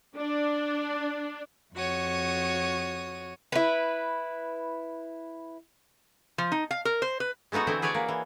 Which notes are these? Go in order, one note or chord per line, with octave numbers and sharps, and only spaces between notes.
D4
F2 F#4 C#5 D#6
E4 B4
F3
D#4
F5
A#4
C5
B4
G#3 A3 B3 D#4 F#4
D3 E3 C4 E4 C5
G#4 B4 C#5 D5 G#5
A#3
E3